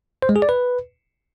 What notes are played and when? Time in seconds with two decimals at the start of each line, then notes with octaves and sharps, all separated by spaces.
0.22 C5
0.29 G#3
0.36 G#4
0.42 D5
0.49 B4